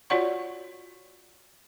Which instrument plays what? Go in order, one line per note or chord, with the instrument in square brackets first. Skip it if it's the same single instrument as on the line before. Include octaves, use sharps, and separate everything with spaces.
[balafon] F4 F#4 C#5 D5 F#5 C#6